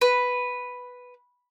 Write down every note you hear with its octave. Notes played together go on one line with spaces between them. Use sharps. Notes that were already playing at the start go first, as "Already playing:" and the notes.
B4